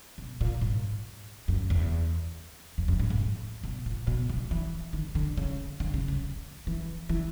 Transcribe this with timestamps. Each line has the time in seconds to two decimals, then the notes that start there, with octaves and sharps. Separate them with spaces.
0.18 B2
0.41 A#2
0.61 G#2
1.48 F#2
1.70 E2
2.78 F2
2.88 F#2
2.99 G#2
3.10 A2
3.63 B2
3.86 A#2
4.07 B2
4.29 C3
4.51 E3
4.93 D#3
5.15 D3
5.37 C#3
5.80 D3
5.94 C#3
6.08 C#3
6.67 E3
7.09 E3